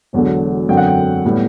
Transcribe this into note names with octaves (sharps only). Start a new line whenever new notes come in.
E1 E2 D3 F#3
F#2 D3 F#3 C4 G5
F#5
G5
A2 G3 B3